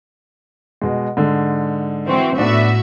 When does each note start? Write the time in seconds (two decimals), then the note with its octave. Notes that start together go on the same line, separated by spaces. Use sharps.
0.82 B2 G#3
1.17 G#2 D3
2.08 E3 C4 F#4
2.38 A2 B3 D4 F#4 E5